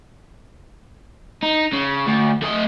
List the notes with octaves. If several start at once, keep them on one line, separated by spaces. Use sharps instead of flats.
D#4
C#3
D2
A3 D#5